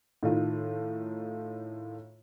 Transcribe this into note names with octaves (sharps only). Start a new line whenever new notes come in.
A2 D#3 F4